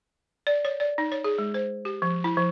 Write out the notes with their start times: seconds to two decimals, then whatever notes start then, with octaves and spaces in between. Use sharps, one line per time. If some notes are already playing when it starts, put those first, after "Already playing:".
0.47 D5
0.65 C#5
0.80 D5
0.98 D#4
1.12 C#5
1.24 G#4
1.38 G#3
1.54 C5
1.85 G4
2.02 F3
2.24 E4
2.37 F3